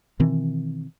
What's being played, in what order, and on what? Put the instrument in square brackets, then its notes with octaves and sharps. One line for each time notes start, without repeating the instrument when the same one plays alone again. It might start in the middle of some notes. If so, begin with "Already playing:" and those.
[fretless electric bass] B2 D#3 E3 C4